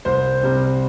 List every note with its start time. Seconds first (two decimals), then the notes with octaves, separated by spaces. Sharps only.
0.05 C2 C5
0.43 C3 G3